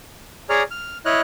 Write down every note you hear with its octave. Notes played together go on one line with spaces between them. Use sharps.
G#4 C#5 D5 A#5 F6
F6
E4 C#5 D#5 F6 F#6